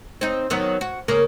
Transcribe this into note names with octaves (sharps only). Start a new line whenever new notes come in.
C4 D#4
D#3 F#3 B3
F#4
C#3 A#3 A#4